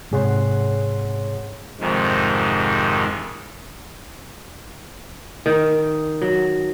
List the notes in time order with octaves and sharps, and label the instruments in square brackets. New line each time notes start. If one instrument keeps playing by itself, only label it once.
[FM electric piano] G#2 C3 G#4 C#5 F#5 C6
[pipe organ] F2 G#2 C3 D#3
[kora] D#3
F#3